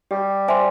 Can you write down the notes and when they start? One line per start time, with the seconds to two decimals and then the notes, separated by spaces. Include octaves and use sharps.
0.11 G3 G4
0.48 C5 E5 G#5 C6